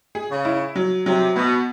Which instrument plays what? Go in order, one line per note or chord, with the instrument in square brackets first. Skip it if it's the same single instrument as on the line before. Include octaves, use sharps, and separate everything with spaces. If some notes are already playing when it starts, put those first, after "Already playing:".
[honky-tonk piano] G#4
[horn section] C#3
[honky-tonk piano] E4
F#3
[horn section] C3 [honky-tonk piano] F#3
[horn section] B2 [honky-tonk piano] B3